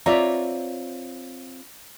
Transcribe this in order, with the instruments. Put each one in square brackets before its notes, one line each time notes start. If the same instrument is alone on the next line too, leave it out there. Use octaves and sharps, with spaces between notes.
[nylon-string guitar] C4 F4 C#5 [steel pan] D5 E5 A#5